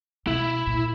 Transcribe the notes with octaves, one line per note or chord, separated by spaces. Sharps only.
B2 E4
A#2